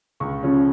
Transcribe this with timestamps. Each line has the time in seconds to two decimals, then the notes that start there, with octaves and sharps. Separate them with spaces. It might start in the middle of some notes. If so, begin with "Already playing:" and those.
0.20 C#2 C#6
0.43 C#3 F3 C#4